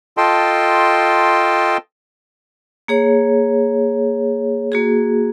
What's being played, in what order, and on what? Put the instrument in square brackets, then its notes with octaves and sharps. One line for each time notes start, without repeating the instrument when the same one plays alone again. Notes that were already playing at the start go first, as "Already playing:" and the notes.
[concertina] F4 A4 D#5 G5 A5 C6
[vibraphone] A#3 G#4 C#5
A#3 F#4 G#4